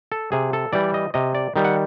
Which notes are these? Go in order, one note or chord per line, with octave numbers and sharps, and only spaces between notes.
A4
C3 G#4
A4
E3 G3 D5
D#5
C3 D#5
D5
D#3 G3
F#5